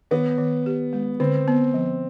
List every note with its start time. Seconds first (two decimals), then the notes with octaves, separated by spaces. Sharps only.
0.11 D#3 B3
0.38 D#3
0.66 G4
0.93 G#3
1.20 D3 C4
1.48 B3
1.74 F3